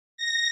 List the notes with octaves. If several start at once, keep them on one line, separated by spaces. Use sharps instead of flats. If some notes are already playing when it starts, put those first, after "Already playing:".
A#6